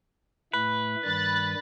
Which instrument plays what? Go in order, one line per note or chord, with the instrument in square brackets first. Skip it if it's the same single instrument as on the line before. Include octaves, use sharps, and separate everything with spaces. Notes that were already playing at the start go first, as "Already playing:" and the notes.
[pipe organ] A2 A3 [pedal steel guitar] B4
[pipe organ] G2 D#3 G3 [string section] B5 F#6 A6